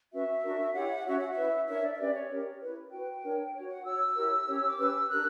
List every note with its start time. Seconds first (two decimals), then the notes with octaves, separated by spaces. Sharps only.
0.12 C#4 F#4 B4 E5
0.43 D4 F#4 A#4
0.74 E4 G4 C#5 F#5
1.05 C#4 F#4 C#5 E5
1.18 F#5
1.31 E5
1.36 E4 B4
1.67 D4 A#4 C#5 E5
1.82 D5
1.94 E5
1.98 C#4 G4 B4 D5
2.13 C#5
2.29 C#4 G4 A#4
2.61 E4 B4
2.91 F#4 B4 G5
3.23 D4 A#4 C#5
3.53 F#4 C#5
3.68 F#5
3.84 F#4 C#5 E6
4.15 E4 G4 A#4 C#5
4.47 C#4 G4 C#5
4.66 D6
4.78 C#4 G4 B4 E6
5.09 D4 G4 A#4 F#6